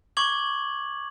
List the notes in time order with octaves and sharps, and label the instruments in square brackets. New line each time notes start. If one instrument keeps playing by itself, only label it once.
[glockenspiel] C#6 D6 G#6 F#7